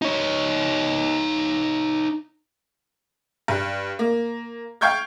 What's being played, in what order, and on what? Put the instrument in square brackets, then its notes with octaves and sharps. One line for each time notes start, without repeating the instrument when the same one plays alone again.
[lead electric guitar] D#4 C#5
[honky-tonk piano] G2
A#3
F5 G5 C#6 G6 G#6